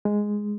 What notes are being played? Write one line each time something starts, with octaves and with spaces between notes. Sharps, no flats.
G#3